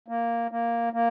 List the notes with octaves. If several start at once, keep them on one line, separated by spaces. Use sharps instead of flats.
A#3
A#3
A#3